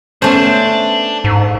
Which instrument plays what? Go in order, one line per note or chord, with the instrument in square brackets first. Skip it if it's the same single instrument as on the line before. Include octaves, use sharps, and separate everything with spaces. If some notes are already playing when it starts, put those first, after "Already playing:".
[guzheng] A3 C5 [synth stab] B3 C#4 [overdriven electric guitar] D4
[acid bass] G#2